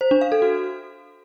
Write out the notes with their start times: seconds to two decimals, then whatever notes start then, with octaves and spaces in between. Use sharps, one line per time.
0.01 C5
0.11 D4
0.21 F5
0.32 A4
0.42 F#4